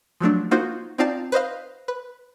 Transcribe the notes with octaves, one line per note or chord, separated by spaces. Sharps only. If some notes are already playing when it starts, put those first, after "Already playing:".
F3 F#3 A3 D4
A#3 D#4 F4 F#4 C5
C4 D#4 F4 D5 F5 A5
B4 C5 D#5 F5
B4